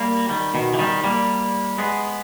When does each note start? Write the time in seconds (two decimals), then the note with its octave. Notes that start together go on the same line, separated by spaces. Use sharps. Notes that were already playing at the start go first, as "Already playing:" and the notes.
Already playing: G3 A#3
0.29 D#3 G3
0.54 B2 D#3
0.73 E3
0.78 D#3 G3
1.04 G3 A#3
1.78 G#3 B3